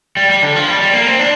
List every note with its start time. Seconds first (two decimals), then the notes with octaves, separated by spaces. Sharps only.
0.17 G3
0.29 G3
0.43 D3
0.55 F3
0.68 G3
0.81 G3
0.93 A#3
1.07 C4
1.19 D4